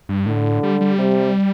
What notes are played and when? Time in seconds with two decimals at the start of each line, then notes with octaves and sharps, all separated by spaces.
0.09 G2
0.26 A2 D3
0.63 G3
0.81 G3
0.98 C3